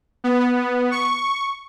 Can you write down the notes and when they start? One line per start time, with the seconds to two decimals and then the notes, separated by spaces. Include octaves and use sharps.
0.24 B3
0.91 C#6